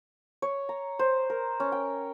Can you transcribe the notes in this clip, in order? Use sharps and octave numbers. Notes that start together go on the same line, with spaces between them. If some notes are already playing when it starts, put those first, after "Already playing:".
C#5
A#5
C5
A#4
C#4
G5